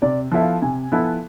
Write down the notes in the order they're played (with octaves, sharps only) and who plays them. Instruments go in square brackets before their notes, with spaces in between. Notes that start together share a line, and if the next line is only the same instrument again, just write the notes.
[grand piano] C3 [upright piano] D5
[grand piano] F3 B3 E4 A4 [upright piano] E5
[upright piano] F5
[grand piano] C3 [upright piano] G#5
[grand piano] F3 B3 E4 A4